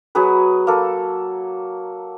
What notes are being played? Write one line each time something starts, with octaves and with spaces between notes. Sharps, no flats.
F#3 B3 G#4 B4
A#3 A4